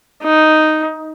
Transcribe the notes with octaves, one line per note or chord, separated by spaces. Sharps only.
D#4